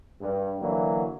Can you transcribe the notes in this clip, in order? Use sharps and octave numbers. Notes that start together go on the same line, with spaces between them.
G2
D3 E3 F#3 A#3